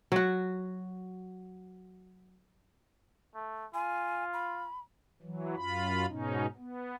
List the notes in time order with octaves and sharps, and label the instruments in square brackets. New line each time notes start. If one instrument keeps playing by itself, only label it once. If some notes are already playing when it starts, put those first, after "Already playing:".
[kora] F#3 F#4
[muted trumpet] A3
[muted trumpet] F4 [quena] G#5
[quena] B5
[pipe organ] E3 F#3
F#2 F4 B5
G#2 B2 C#4 D#4
B3